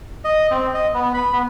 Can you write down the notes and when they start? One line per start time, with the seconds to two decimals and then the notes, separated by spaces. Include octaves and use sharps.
0.24 D#5
0.51 C4
0.74 D#5
0.94 B3
1.14 B5
1.33 B3